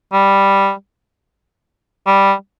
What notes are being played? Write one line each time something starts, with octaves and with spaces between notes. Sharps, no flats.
G3
G3